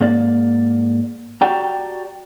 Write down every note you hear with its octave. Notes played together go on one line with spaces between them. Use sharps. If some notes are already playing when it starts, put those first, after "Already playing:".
G#2 A#3 D5
F#4 G4 D5 G5 A5 A#5